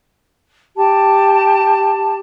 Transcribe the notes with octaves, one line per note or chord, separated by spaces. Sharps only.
G4 A5